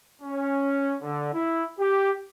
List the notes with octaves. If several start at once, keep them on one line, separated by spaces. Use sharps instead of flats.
C#4
D3
E4
G4